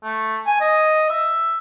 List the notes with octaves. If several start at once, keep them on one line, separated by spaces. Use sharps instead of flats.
A3
G#5
D#5
E5